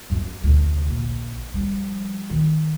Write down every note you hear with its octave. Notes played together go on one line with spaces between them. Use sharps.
F#2 C#4
D2 C3
A#1
F3 G3
D#3 E4